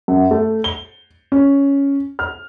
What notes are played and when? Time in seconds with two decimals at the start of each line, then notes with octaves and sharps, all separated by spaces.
0.08 F#2
0.31 A3
0.64 G7
1.32 C#4
2.19 F6